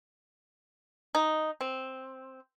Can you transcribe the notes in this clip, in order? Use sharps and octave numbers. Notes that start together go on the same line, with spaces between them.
D#4
C4